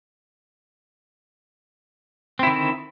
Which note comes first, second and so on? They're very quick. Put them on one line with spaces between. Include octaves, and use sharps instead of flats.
C4 E4 D#3 D3